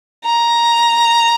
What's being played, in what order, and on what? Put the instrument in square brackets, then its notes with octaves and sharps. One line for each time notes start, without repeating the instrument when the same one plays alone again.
[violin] A#5